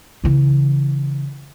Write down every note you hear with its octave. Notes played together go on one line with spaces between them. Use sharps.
C#3 E3